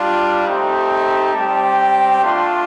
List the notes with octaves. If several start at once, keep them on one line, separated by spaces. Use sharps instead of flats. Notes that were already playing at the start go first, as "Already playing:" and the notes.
Already playing: G3 D4 F4
A3 C4 D#4 G4
G3 C4 G4 A5
A3 D4 F4 C6